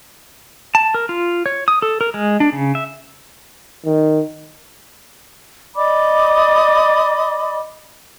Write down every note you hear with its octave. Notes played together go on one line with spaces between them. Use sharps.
A5
A#4
F4
C#5
D#6
A4
A#4
G#3
D4
C#3
E5
D#3
D5 D#5 B5 D6